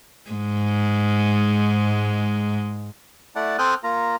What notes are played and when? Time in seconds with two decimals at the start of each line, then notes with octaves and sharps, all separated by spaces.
0.31 G#2 G#3
3.36 A3 E4 D5 F#5 A5
3.58 C4 A4 G5 D#6 F6 F#6
3.84 A#3 F4 A#5